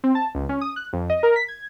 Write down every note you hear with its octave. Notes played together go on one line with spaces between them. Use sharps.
C4
A5
C#2
C#4
D#6
F#6
F2
D#5
A#4
B6
G#6